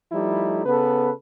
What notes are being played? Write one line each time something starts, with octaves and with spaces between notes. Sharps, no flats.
F3 G3 A3 D#4 E4
C#3 B3 A4 B4